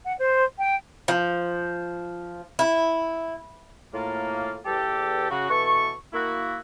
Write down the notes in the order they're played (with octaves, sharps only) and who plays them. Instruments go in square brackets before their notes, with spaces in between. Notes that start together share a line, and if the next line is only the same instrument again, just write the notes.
[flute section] F#5
C5
G5
[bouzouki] F3
E4
[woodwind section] A2 A#3 F4
E2 G4 A4
C#3 F#4
B2 E3 A4 C#6
A#3 E4 F#4